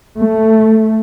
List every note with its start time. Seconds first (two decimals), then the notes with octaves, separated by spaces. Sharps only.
0.18 A3